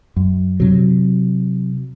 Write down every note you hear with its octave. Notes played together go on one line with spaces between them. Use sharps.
F#2
C3 F#3